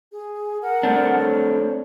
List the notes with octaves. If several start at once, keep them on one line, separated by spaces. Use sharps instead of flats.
G#4
A#4 F#5
A3 C4 D4
C#5